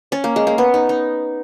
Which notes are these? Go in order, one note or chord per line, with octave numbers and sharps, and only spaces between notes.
C#4
A#3
G#3
A#3
B3
D#4
D#4